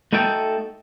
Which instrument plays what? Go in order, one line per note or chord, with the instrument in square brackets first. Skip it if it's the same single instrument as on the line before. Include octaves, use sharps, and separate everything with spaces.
[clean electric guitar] A3 D#4 F#4 A4 G5 A5